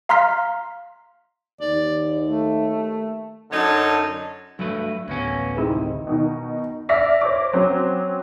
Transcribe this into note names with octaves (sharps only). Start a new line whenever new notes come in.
F5 A#5 C6 F6 B6
D#2 D5
A3
F#2 D3 D#4 C#5 A5
G2 F#3 A3 B4
A1 D2 F#3 A#3 B3 C#4
C3 D#3 G#3 C4 E4
B2 D#3 D#4
D5 E5 D6 F6 A#6 B6
C5 C#5 D6
F#3 C4 C#4 C5